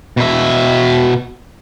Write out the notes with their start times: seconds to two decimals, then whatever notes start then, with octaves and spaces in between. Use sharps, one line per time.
0.17 B2 E5